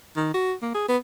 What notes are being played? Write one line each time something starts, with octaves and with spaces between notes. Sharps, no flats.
D#3
F#4
A#3
G#4
B3